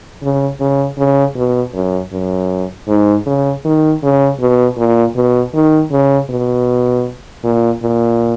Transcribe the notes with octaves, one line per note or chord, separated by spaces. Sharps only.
C#3
C#3
C#3
B2
F#2
F#2
G#2
C#3
D#3
C#3
B2
A#2
B2
D#3
C#3
B2
A#2
A#2